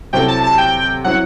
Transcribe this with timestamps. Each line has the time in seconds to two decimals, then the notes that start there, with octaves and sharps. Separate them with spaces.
0.13 C3 F#3 C4 E4 A4 G5
0.28 A5
0.43 A5
0.58 G5
1.04 F#3 C4 E4 F#5